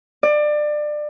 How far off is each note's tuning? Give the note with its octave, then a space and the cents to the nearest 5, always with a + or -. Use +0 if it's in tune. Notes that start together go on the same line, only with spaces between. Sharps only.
D5 +25